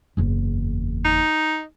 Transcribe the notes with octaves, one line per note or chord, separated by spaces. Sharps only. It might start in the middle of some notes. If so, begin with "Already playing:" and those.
F#1 E2
D#4